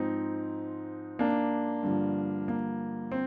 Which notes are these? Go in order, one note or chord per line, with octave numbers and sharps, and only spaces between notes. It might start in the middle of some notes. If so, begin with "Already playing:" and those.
Already playing: G#2 F3 C4 D#4
A#3 D4
G2 D3 F3
A#3
C4